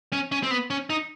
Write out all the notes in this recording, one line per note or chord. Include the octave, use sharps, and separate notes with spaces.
C#4
C#4
C4
B3
C#4
D#4